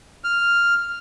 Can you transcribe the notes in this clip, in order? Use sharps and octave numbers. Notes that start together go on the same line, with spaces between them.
F6